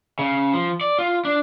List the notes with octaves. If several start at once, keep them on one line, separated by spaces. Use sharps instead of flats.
C#3
F3
D5
F4
D4